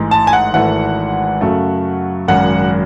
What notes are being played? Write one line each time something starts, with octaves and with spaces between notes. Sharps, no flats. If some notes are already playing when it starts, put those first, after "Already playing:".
Already playing: A1 G#2 E3 G#3
A5
G#5
F#5
G#1 G#2 E3 A3 F#5
F#2 C#3 F#3 A3
G#1 F#2 C#3 F#5